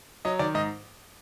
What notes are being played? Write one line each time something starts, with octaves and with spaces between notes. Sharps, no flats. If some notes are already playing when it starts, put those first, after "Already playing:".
F#3 D#5
D#3 D5
G#2 D#5